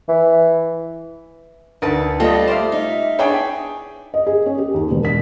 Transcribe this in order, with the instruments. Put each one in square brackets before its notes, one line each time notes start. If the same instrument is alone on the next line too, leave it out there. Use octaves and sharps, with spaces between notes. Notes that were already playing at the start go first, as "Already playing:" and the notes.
[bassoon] E3
[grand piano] D2 A6 [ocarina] D#4 [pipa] A#4 B4 A5
[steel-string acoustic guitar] G3 A3 F4 [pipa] C4 [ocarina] A4 [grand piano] D#5 A5
[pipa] C5 D5 F5 [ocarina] E5
[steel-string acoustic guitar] D#4
[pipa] B3 D4 E4 [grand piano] G#4 C#5 G5
[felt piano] D#5
G#4
C#4
G4
D#2
E1
B6